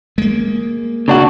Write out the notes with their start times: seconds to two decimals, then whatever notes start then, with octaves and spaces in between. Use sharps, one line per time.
0.18 G#3 A#3
1.08 C#3 D4 F#4